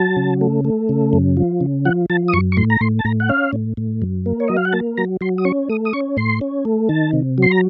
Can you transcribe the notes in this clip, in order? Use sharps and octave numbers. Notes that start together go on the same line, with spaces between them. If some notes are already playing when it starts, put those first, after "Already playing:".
Already playing: F#3 A5
C#3
A3
A3
C#3
F#2
F3
C#3
F3 F#5
F3 A5
D#6
F#2 C#6
C#6
A2 C6
A#5
A2 C6
A5
A2 A#5
F#5
C#4 F5
A2
A2
F#2
A#3
C#5
F#3 D#5
F5
F#5
A#3 A5
F#3 A#5
F#3 C6
D#6
C#4 C#6
A3 D#6
D#6
C#4 C#6
A2 C6
C#4
A3
D#3 A5
C3
F#3 C6
A#5